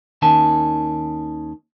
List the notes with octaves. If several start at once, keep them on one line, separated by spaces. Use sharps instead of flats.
D#2 D#3 C#4 A5